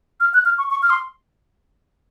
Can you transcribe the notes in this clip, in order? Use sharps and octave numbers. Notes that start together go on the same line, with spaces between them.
F6
F#6
F6
C#6
C#6
F6
C6